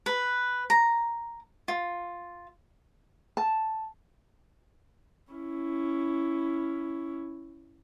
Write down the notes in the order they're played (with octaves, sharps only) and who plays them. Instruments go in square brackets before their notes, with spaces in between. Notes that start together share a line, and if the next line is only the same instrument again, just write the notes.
[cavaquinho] B4
A#5
F4
[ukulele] A5
[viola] C#4 E4